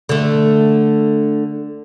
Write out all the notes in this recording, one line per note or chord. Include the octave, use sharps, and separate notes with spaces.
D3 A3